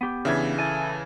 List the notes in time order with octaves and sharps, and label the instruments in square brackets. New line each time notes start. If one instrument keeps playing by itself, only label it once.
[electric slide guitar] B3 G4
[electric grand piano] C#3 E3 [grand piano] D4 E5 G#6
[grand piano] E4 [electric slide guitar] A4 G#5